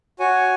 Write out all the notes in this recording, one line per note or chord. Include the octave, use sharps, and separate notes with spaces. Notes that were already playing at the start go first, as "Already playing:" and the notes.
F#4 C#5 G#5